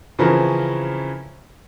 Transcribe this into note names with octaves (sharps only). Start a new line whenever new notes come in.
C#3 E3 F3 C4 C#4 A#4